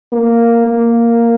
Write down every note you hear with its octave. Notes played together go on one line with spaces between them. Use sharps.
A#3
A#3